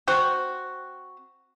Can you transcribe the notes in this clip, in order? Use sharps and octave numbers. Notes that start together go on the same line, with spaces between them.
C4 F#4